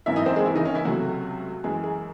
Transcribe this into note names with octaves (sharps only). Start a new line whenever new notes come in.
G#1 F#2 E3 E4 E5
D#4 D#5
C4 C5
G#3 G#4
E3 E4
D#3 D#4
C#4
E3 E4
C#2 C3 F#3 A3 F#4
F#2 E3 G#3 G#4
G#3 G#4